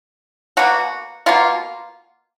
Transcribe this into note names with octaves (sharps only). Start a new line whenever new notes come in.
B2 A#3 F#4
B2 A#3 F4